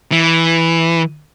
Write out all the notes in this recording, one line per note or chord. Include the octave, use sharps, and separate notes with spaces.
E3